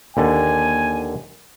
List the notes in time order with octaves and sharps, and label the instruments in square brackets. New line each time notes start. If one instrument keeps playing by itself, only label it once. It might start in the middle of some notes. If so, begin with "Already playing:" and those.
[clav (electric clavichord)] D#2 D3 A5 [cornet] G#5